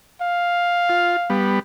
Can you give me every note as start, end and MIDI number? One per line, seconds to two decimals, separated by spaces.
0.22 1.41 77
0.89 1.16 65
1.30 1.59 55
1.30 1.59 59